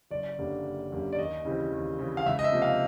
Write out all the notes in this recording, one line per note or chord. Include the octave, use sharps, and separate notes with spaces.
F#1 D5
F#2 D3 G3 A#3
F#1
F#2 D3 G3 A#3
D5
D#2 D#5
C#3 E3 G3 C4
D#2
C#3 E3 G3 C4
F5
C#2 E5
D#5
E5
C3 F3 A#3
F5